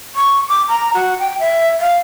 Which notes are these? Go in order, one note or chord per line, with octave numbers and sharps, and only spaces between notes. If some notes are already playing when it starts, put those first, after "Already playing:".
C#6
D6
A#5
F#4
G5
E5
F5